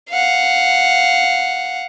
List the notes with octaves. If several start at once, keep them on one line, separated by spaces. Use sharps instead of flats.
F5 F#5